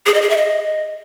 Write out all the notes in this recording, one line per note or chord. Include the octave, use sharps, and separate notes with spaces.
G#4
D#5
G#4
E5
D#5